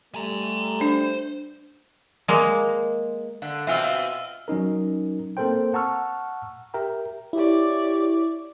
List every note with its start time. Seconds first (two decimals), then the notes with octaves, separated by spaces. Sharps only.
0.15 G3 A3 G#5 A#5
0.81 D4 C5
2.28 G#3 A#3
3.42 D3 F5
3.67 B2 C4 F4 E5 G#5 E6 F6 D#7
4.48 F#3 C#4 D#4 A#4
5.37 A#3 C4 A4 A#4 C5 G5
5.74 F#5 A5 A#5 C#6 E6 F6
6.74 G4 A#4 E5 G5 A#5
7.33 E4 G4 C#5 D5